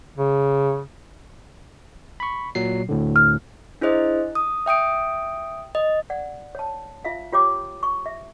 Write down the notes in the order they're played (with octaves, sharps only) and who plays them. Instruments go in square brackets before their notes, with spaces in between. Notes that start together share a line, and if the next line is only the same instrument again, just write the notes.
[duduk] C#3
[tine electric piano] B5 C#6
A#2 F#3 C7
D2 A2 D3
[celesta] F6
[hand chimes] D4 E4 G#4 C5 D#5
D#6
E5 G5 D#6 D7
D#5
[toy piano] D5 F#5
C#5 A5
F4 E5 F5
F4 G4 C#5 G5 D6
C#6
E5